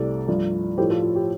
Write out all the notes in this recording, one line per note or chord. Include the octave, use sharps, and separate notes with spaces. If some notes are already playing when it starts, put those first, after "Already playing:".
Already playing: C2 C3 A3 A4 D5
G2 F3 A3
A2 F3 A3 G4 C5
F4 A4
F4
G4